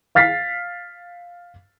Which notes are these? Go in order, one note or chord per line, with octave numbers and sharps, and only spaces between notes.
F5 F6 A6 B6 C7